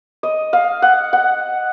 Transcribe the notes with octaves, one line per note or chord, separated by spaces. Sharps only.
D#5
F5
F#5
F#5